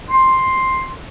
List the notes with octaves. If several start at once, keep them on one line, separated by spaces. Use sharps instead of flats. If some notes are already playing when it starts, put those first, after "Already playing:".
C6